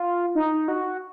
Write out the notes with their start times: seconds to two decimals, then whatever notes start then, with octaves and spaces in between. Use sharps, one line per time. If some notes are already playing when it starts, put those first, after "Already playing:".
Already playing: F4
0.35 D#4
0.68 F#4